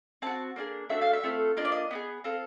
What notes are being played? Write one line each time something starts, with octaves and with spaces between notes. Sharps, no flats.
C4 D#4 F#4 A5
A#3 D4 F4 G#4
A3 D4 F#4 A4 E5
F5
E5
A3 C4 F4 A4
A#3 D4 F4 D#5
D5
D#5
B3 D#4 G#4
C4 F4 A4